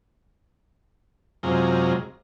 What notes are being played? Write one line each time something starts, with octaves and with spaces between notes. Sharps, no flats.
F#2 C3 G#3 F4 A#5